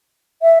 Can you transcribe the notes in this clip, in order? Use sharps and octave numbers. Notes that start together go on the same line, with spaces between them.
E5